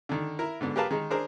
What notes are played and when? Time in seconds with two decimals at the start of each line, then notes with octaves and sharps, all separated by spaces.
0.09 D3 D#3
0.39 E4 A#4
0.61 G#2 D3 B3
0.76 G4 G#4 A#4 B4 F5 A5
0.91 D#3 G#3 D#4
1.10 D4 G#4 A#4 C5